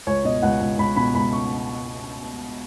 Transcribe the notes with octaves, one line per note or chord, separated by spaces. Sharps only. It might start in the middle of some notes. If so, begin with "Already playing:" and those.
C#2 C#5
B2 D#5
C#2 F#5
C#2
C#2 B5
B2 B5
C#2 B5
C#6